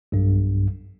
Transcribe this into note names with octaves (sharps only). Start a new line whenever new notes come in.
B1 G2